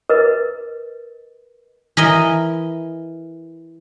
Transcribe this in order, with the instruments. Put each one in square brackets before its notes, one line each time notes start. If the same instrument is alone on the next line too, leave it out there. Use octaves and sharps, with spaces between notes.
[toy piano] A#4 B4 D#5
[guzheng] E3 A#4 D#5